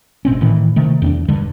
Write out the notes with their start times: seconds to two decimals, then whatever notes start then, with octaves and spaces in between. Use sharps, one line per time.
0.25 G#1 B2 C4 C#4
0.41 A2 D#3 E3
0.76 C3 D#3 A3
1.02 E2 C#4 D4
1.28 E1 G2 D3 G3